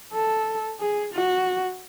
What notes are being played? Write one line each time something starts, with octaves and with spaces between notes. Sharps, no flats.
A4
G#4
F#4